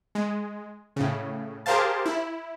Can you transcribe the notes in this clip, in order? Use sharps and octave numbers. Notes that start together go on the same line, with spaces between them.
G#3
A2 C#3
G4 G#4 A#4 C5 F5 A5
E4